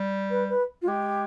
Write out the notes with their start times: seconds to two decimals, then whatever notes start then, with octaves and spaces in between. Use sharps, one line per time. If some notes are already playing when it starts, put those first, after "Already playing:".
Already playing: G3
0.30 B4
0.49 B4
0.81 F4
0.87 G#3 G4